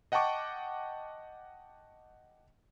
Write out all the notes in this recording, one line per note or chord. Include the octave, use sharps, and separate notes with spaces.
D#5 F#5 G5 A5 C#6 D6